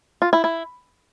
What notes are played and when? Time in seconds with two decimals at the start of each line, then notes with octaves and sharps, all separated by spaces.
0.22 F4
0.33 E4
0.44 E4